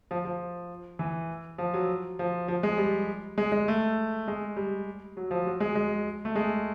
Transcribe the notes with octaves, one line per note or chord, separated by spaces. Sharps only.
F3
F3
E3
F3
F#3
F3
F3
G#3
G3
G#3
G#3
A3
G#3
G3
F#3
F3
F#3
G#3
G#3
A3
G#3